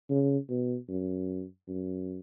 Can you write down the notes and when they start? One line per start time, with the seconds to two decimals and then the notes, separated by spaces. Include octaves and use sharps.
0.09 C#3
0.49 B2
0.88 F#2
1.68 F#2